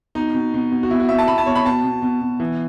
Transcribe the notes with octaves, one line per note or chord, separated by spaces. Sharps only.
B2 D#4
B2
B2
B2
F#4
B2 E4
F#4
B2 E5
A5
B2 B5
A5
B2 C#5
B5
B2 A5
B2
B2
B2
E3